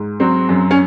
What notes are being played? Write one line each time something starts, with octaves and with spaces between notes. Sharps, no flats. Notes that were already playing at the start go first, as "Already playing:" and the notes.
Already playing: G#2
F#3 C4
F#2
C#4